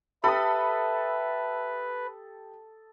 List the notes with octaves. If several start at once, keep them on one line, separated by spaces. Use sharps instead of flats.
G4 A4 B4 E5 B5 D#6